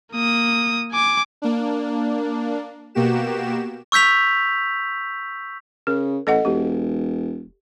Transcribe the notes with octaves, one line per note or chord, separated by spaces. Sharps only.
A#3 D#6
G#5 D6
A#3 D4
B2 A#3 F#4 G4 E7
C#6 E6 G6 B6 F7
C#3 A#4
A1 A4 D#5 F#5
E1 G4